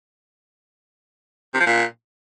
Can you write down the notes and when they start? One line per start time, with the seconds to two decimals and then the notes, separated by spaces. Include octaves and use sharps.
1.54 C3
1.60 F3
1.67 A#2